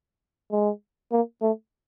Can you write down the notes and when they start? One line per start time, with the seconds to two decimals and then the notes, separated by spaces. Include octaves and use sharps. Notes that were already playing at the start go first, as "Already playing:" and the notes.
0.52 G#3
1.12 A#3
1.42 A3